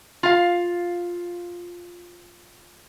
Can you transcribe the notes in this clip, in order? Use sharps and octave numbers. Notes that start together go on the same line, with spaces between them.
F4 F5